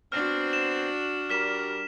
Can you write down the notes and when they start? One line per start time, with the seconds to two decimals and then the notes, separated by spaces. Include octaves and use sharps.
0.12 B3 C4 D4 F#4 C5 F6
0.53 E7
1.30 G3 A#4 F6 B6 E7